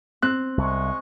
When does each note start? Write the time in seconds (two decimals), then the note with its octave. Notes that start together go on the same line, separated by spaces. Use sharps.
0.22 C4 F#6
0.58 C2 G#3 C#6